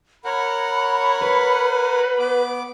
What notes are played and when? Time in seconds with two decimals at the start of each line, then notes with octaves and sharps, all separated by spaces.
0.25 A#4 C#5 F#5 B5
1.22 B4
2.19 B3 D6